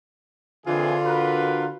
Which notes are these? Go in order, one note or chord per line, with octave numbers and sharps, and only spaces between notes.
F2 D3 E3 F4 G#4
F#4 A#4 B4